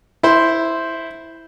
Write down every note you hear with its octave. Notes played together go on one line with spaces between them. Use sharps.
E4 C5